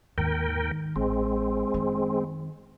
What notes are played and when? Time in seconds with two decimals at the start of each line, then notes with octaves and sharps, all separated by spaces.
0.18 D#2 G#2 D#3 A#4 G5
0.96 A1 G#3 C4
1.74 F#2 D#3